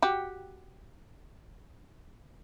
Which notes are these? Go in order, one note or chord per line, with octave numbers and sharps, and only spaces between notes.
F#4 G4